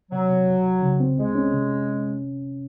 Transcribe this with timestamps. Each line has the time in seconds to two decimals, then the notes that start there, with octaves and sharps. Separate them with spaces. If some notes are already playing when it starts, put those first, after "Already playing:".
0.12 C3 F#3
0.29 C3
0.47 C2
0.65 C2
0.82 C#3
1.00 C4
1.18 C2 G#3
1.35 C#4
1.53 C3